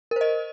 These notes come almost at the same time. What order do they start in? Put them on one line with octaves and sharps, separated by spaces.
A#4 C5 D#5